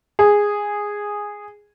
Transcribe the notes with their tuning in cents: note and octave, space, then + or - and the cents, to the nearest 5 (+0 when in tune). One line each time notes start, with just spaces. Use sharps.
G#4 -10